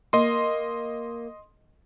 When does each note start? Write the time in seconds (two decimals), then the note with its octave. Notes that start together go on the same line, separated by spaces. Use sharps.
0.13 A#3 D#5 C6